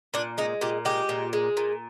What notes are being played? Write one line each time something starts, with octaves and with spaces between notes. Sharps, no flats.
A#2 D4
G#3 D#4
A#2 G4
G#3 G4
A#2
G#3
A#2